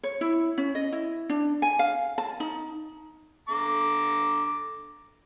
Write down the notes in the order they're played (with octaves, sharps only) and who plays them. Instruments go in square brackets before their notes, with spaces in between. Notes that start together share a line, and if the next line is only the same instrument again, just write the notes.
[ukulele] C#5
E4
C#4
D#5
E4
D4
G#5
F5
A5
D#4
[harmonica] D3 A#5 D6